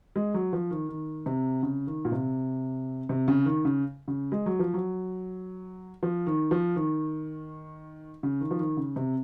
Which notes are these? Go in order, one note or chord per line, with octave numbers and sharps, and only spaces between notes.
G#3
F#3
F3
D#3
D#3
C3
C#3
D#3
A#2
C3
C3
C#3
D#3
C#3
C#3
G#3
F#3
F3
F#3
F3
D#3
F3
D#3
C#3
D#3
F3
D#3
C#3
C3